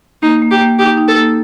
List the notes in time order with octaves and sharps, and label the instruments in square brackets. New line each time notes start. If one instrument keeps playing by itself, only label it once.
[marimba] A#3 [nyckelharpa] D#4
[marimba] A#3
[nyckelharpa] G4
[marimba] A#3
[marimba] D#4 [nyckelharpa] G4
[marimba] D#4
[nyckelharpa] A4
[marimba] A#3